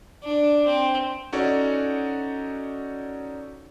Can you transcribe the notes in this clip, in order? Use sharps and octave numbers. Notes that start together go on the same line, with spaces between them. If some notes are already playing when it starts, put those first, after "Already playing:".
D4
C4
C#4 D#4 F#4 A4 C#5 D5